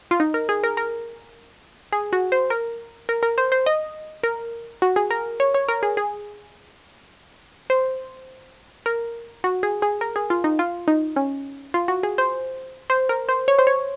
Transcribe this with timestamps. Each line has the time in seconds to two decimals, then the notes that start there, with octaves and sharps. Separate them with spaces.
0.11 F4
0.20 D#4
0.34 A#4
0.49 G#4
0.64 A#4
0.77 A#4
1.92 G#4
2.13 F#4
2.32 C5
2.50 A#4
3.09 A#4
3.23 A#4
3.38 C5
3.52 C5
3.66 D#5
4.23 A#4
4.82 F#4
4.96 G#4
5.11 A#4
5.40 C#5
5.54 C#5
5.69 A#4
5.83 G#4
5.97 G#4
7.70 C5
8.86 A#4
9.44 F#4
9.63 G#4
9.82 G#4
10.01 A#4
10.16 G#4
10.30 F4
10.44 D#4
10.59 F4
10.88 D#4
11.16 C#4
11.74 F4
11.88 F#4
12.03 G#4
12.18 C5
12.90 C5
13.09 A#4
13.29 C5
13.48 C#5
13.59 C5
13.67 C#5